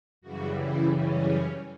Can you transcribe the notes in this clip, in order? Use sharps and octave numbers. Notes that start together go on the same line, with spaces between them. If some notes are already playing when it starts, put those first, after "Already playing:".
F#2 C#3 E3 G3 F#4
E4
C#4